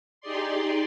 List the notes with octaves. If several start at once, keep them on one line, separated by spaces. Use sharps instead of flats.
D#4 G4 G#4 D5 C6